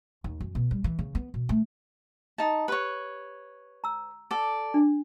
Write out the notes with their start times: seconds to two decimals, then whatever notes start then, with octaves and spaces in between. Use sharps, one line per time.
0.24 D#2
0.40 F#2
0.55 B2
0.71 G3
0.84 E3
0.99 C#3
1.15 B3
1.34 B2
1.49 A3
2.38 D#4 A5
2.68 G4 B4 C#5
3.84 A#5 E6
4.31 A4 D5
4.74 D4